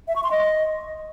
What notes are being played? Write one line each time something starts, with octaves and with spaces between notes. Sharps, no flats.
E5
C#6
C6
D#5